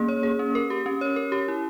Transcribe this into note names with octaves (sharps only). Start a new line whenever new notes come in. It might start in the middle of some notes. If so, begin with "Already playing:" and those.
Already playing: A#3 C#4 G#4
C#5
G#4
C#4
A#4
G4
C#4
C#5
A#4
G4
E4